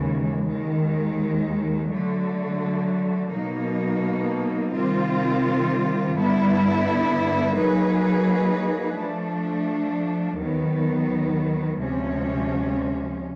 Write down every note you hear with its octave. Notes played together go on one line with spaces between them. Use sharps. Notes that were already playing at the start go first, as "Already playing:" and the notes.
Already playing: D#2 C#3 E3 G#3
D#2 D#3 G#3
D3 F#3 A3
B2 F#3 A#3 D#4
C3 D#3 G3 C4 F4
G2 D3 G3 B3 E4
F#3 A#3 D#4 G#4 B4
F3 A3 D4
D#2 D#3 F#3 B3
D2 C3 F3 G#3 C#4